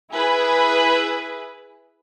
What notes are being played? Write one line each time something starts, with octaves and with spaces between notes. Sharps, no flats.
E4 G#4 B4